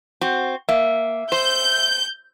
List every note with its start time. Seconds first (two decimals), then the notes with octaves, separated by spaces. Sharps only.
0.21 C4 F#4
0.69 A#3 E5
1.32 C5 G6